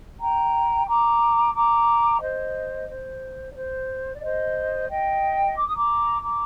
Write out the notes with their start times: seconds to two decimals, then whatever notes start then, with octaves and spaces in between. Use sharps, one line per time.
0.19 G5 A#5
0.86 A#5 D6
1.54 A#5 D6
2.20 C5 D#5
2.88 C5
3.50 D5
3.55 C5
4.13 D5
4.21 C5 D#5
4.89 D#5 G5
5.56 D6
5.66 D#6
5.75 A#5 D6
6.22 A#5 D6